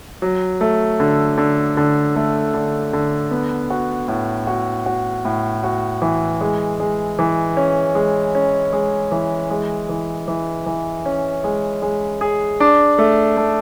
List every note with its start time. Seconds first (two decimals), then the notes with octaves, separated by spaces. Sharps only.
0.22 F#3
0.61 A3
1.00 D3
1.38 D3
1.77 D3
2.16 A3
2.54 D3
2.93 D3
3.31 B3
3.70 F#4
4.08 A2
4.47 F#4
4.86 F#4
5.25 A2
5.64 F#4
6.02 E3
6.41 G#3
6.80 G#3
7.19 E3
7.57 C#4
7.95 G#3
8.35 C#4
8.73 G#3
9.12 E3
9.50 G#3
9.89 E3
10.28 E3
10.66 E3
11.06 C#4
11.44 G#3
11.82 G#3
12.21 G#4
12.60 D4
12.98 A3
13.37 A3